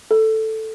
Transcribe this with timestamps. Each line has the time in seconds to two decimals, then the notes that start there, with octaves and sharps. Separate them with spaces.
0.11 A4